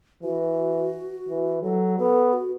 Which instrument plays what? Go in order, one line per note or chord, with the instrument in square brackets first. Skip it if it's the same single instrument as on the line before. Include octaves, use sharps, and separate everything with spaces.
[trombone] E3 [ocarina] F#4
[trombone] E3
[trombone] F#3 [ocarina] A4
[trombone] B3 [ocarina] A4
[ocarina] F#4